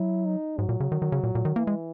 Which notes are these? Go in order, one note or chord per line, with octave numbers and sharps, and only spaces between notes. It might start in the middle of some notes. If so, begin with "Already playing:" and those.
Already playing: F#3 E4
D#4
G#2 F#3
A#2
C#3
D#3
D#3
C#3
A#2
A#2
D#3
E3 A#3
G#3